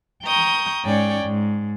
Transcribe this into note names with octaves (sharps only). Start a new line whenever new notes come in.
G5 A#5 C#6 D#6 G6
G#2 C#4 C#5 D5 G5
G#2